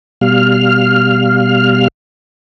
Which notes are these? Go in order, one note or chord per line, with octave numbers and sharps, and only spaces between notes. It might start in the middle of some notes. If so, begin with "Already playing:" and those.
B2 G3 F5 F6